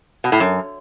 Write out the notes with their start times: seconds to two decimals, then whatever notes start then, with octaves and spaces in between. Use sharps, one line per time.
0.24 B2
0.32 A2
0.40 F#2